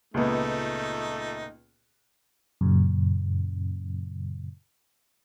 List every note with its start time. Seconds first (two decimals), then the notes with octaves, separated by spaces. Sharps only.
0.14 C#2 A#2 A3 B3 D#4
2.61 F#2 A#2 C#3